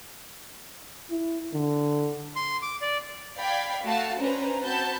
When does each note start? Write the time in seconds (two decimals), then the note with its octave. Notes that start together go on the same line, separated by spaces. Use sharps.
1.11 E4
1.54 D3
2.36 C6
2.62 D6
2.82 D5
3.38 D5 F5 G5 B5 G#6 B6
3.84 A3 F#4 F5 A5
4.19 C#4 D4 B4 C5 A#5
4.64 C4 F#4 A5 B5 G6